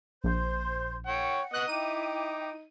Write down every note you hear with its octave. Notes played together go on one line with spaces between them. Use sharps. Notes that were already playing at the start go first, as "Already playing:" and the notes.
A#1 C5 C6 G6
C#5 F#5 G5
B3 D#5 F#6
D#4 E4 G5 D6 D#7